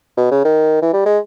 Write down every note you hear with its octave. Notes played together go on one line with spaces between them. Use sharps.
B2
C#3
D#3
E3
G3
G#3